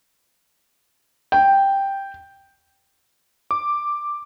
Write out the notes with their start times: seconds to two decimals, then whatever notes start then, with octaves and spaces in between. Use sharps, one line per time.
1.32 G5
3.51 D6